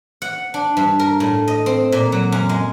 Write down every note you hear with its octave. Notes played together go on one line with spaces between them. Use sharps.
F#5
D4
G2
A#4
A2
D#5
C4
A#2
F#3
F#2
G#3